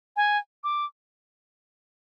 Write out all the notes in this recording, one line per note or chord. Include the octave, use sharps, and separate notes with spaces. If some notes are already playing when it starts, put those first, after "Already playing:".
G#5
D6